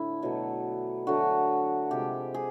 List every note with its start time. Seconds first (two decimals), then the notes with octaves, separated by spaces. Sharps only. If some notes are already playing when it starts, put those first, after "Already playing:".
Already playing: A2 D3 E4
0.22 B2 F#3 A3
1.07 D3 F#3 A3 F#4
1.91 C3 F3 G#3 G4
2.34 G#4